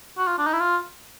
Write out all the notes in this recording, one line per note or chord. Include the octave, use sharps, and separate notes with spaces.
F#4
F4
D4
D#4
E4
F4